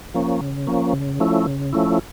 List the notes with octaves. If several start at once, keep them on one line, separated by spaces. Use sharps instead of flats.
F3 A#3 C#4
C#3
F3 A#3 C#4
C#3
F3 A3 C#4 E4
C#3
F3 A3 C#4 E4